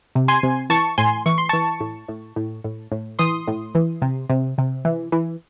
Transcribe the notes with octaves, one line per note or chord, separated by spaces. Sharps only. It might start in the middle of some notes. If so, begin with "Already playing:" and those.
C3
G#5 C6
C3
E3 A5 C#6
A2 G#5 C6
E3 C#6
C6
E3 A5 C#6
A2
A2
A2
A2
A2
E3 C6 D#6
A2
E3
C3
C3
C3
E3
E3